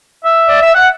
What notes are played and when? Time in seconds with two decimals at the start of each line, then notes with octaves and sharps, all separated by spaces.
0.24 E5
0.49 D5
0.62 E5
0.75 F#5